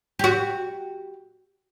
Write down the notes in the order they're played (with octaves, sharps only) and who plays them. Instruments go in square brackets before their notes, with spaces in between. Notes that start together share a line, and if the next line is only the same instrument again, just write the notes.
[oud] F#4 G4